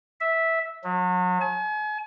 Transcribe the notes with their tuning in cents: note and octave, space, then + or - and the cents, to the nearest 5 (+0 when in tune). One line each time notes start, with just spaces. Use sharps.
E5 -10
F#3 -35
G#5 +40